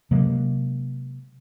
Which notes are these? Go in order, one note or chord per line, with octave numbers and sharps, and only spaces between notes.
C3 F#3 G#3 A#3